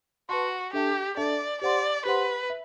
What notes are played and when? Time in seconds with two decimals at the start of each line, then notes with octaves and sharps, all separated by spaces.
0.29 F#4 B4 F#5 A5 C6
0.73 D4 G4 A4 E5 A5
1.17 D4 A4 D5 E5 A5
1.62 G4 C5 D5 F#5 C6
2.05 G4 B4 C5 F#5 C6
2.50 E5